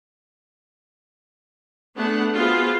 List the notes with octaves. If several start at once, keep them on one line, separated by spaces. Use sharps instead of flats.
A3 B3 D4 G#4 F#5
B3 F4 F#4 G#4 C5